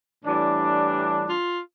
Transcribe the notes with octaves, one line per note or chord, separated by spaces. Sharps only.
A2 E3 G3 D4
F4